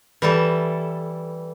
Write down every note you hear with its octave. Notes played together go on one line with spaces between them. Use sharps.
E3 G3 A4